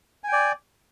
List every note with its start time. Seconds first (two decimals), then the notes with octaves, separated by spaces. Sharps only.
0.24 G#5
0.28 G5
0.33 D5